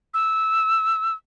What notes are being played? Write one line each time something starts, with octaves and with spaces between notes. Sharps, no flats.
E6